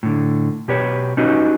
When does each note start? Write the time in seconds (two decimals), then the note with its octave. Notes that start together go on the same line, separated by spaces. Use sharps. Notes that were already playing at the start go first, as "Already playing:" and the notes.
0.03 A2 D3
0.68 B2 G4 B4 C#5
1.17 C#4 D#4 F#4 G4 B4 D#5